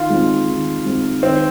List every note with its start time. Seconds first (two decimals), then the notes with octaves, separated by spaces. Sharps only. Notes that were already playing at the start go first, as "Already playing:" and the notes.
Already playing: D#3 F4
0.10 G#3 C4 D#4
0.48 D#3
0.85 G#3 C4 D#4
1.23 D#3 C4